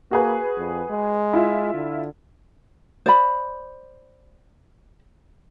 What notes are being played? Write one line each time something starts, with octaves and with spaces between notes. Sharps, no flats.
A#3 F#4 G#4 B4
F2
G#3
E4 F4 E5
D3
C5 D5 B5